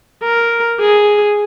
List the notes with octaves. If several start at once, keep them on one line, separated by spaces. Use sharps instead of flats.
A#4
G#4